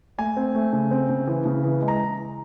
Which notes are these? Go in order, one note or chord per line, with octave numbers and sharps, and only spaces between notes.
A3 G#5
C4
A3
C#3
C4
C#3
E3
C#3
E3
G#3
A#5